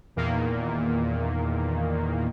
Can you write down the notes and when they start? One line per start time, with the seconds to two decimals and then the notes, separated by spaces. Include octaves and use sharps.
0.16 E2 A#2 D#3 A#3